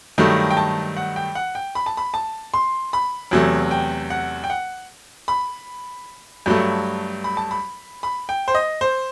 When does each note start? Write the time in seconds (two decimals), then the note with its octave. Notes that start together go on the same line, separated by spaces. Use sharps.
0.18 G2 D#3 F#3 A3
0.51 G5
0.57 A5
0.97 F#5
1.16 G5
1.35 F#5
1.55 G5
1.75 B5
1.86 A5
1.97 B5
2.14 A5
2.54 C6
2.93 B5
3.31 E2 C3 F#3 A3
3.71 G5
4.10 F#5
4.44 G5
4.50 F#5
5.28 B5
6.46 G2 F#3 A3
7.24 B5
7.37 A5
7.51 B5
8.03 B5
8.29 G5
8.48 C5
8.54 D#5
8.81 C5